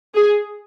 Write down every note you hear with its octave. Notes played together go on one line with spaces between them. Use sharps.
G#4